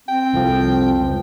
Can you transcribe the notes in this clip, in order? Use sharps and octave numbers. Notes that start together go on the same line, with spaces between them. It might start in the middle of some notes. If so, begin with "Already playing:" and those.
C4 G5
C2 F2 F3
C#2